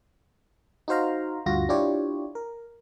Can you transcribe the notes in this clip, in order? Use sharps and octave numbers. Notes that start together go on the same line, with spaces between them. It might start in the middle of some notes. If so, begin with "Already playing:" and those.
D#4 F#4 C5 F5 A#5
D2 G2 F4 F#4 A#6
D4 E4 F4 G4 C#5 D5
A#4